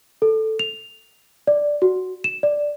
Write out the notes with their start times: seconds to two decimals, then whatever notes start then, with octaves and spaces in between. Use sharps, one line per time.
0.22 A4
0.59 F7
1.47 D5
1.82 F#4
2.24 E7
2.43 D5